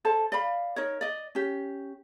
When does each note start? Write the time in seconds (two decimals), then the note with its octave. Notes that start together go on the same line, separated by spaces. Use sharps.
0.05 A4 C5 A5
0.32 D5 F5 B5
0.76 D#4 A#4 C#5
1.01 D5 D#5
1.35 C#4 G4